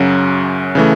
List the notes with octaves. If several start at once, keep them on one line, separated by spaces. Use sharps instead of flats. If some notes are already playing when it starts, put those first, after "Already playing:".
Already playing: F#2 C#3 F#3 C#4 F#4
C#3 E3 A3